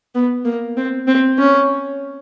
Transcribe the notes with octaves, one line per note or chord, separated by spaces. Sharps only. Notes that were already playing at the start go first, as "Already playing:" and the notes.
B3
A#3
C4
C4
C#4